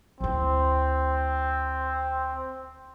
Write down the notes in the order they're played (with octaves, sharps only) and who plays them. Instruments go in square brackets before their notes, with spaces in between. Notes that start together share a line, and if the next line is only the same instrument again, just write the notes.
[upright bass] D2 E4 [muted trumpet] C4